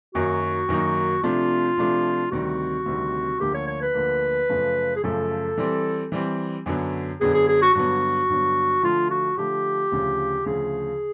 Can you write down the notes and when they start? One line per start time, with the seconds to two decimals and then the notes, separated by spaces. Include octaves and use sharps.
0.15 F#2 D#3 F#3 A#3 D#4 F#4
0.69 F#2 D#3 F#3 A#3 D#4
1.23 C3 F3 A3 D4 F4
1.77 C3 F3 A3 D4
2.32 D2 C3 D#3 G3 C4 F#4
2.86 D2 C3 D#3 G3 C4
3.40 D2 D3 F3 A#3 G4
3.54 C#5
3.68 C#5
3.81 B4
3.94 D2 D3 F3 A#3
4.49 F#2 C#3 F3 A3
4.96 G#4
5.03 F#2 C#3 F3 A3 A4
5.58 E3 G3 C4
6.12 E3 G3 C4
6.66 F#2 D3 F#3 B3
7.21 F#2 D3 F#3 B3 G#4
7.34 G#4
7.48 G#4
7.62 F#4
7.74 G2 D3 F#3 B3 F#4
8.29 G2 D3 F#3 B3
8.83 D3 F3 A3 F4
9.11 F#4
9.37 D3 F3 A3 G4
9.92 D2 C#3 F3
10.46 D2 C#3 F3 G#4